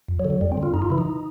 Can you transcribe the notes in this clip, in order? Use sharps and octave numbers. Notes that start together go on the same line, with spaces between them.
F2
F#3
D3
F#3
F2 G3
C4
D3
F4
F#2 D#4
F4
C#3 E3 E4
D#4